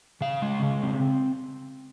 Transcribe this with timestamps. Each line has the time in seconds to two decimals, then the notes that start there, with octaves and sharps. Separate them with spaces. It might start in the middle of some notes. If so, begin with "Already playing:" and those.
0.21 C#3 F5
0.42 G#3
0.62 C#3
0.82 C4